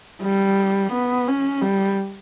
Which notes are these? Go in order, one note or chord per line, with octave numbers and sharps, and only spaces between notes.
G3
B3
C#4
G3